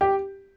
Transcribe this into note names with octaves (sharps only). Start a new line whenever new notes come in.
G4